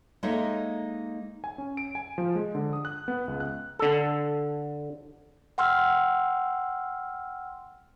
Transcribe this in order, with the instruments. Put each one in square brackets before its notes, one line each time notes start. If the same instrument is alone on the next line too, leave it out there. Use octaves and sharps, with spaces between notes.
[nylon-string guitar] G#3 A#3 D#4 A4 C#5 E5
[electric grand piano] G#5
C#4
D7
G#5
F3
G#3
D3
D#6
F#6
B3
C#2
F#6
[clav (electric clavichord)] D3 A4
[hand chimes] F#5 G5 C6 E6 F6